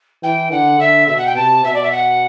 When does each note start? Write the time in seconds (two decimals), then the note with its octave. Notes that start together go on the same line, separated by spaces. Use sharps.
0.23 E3 G5
0.51 D3 F#5
0.79 D3 E5
1.07 B2 E5
1.17 F#5
1.26 G5
1.36 C3 A5
1.63 B2 E5
1.73 D5
1.83 E5
1.92 F#5